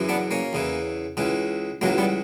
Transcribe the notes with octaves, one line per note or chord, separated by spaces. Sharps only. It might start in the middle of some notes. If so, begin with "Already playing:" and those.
Already playing: F#2 C#3 E3
B3 D4
A#3 C#4
E2 C#3 E3
C#2 C#3 E3
C#2 C#3 E3 F#3 A#3
G3 B3